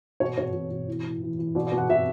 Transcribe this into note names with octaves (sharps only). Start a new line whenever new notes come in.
B2 C#5
B2 C#5
B2
B2
E3
A2
E3
E3
B2 D5
D5
B2
F#5
B2 E5